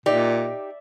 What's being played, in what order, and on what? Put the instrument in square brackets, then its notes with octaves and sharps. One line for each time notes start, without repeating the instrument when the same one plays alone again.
[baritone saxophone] A#2 [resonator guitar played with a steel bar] D#4 G4 [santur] D5 E5